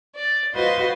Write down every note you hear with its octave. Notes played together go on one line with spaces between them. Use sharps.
D5
F4 F#4 B4 C5 D#5 C6